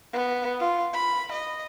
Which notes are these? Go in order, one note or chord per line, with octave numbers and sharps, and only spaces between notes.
B3
F4
B5
D#5